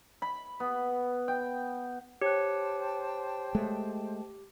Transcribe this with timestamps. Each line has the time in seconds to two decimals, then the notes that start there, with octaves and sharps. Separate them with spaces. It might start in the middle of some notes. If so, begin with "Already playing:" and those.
0.22 B5
0.60 B3
1.28 G5
2.22 G4 C5 C#5 G5 A5 F#6
3.55 G#3 A3